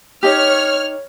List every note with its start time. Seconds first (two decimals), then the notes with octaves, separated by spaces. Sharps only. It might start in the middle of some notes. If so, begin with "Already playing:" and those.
0.23 D#4 G4 C#5 F6